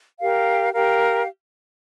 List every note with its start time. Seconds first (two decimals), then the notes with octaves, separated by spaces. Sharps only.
0.19 G4 A#4 F5
0.73 G4 A#4 F5